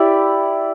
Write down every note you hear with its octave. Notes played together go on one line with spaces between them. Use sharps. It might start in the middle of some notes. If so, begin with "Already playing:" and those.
Already playing: E4 G4 D5